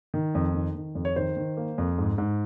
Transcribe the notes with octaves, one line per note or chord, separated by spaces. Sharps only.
D#3
F2
D#3
D#3
F2
C#5
D#3 C5
D#3
A#3
F2
G#2
G#2